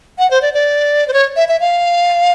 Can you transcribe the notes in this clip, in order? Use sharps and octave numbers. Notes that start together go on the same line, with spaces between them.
F#5
C5
D5
D5
C5
C#5
E5
E5
F5